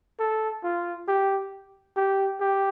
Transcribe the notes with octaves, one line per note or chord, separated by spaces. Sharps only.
A4
F4
G4
G4
G4